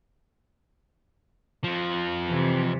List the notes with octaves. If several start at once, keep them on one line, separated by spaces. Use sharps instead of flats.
F2 F3
C3 E3